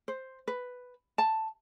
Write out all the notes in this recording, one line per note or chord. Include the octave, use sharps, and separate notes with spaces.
C5
B4
A5